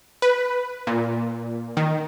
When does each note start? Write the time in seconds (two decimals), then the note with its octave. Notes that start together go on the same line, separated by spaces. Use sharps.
0.22 B4
0.87 A#2
1.77 D#3